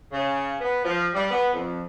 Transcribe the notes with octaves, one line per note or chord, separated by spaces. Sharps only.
C#3
B3
F3
G3
B3
F2